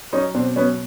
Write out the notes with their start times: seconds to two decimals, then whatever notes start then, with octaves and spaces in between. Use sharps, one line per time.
0.12 F#3 C#4 D#4
0.34 B2 C4 D4
0.56 F#3 B3 C#4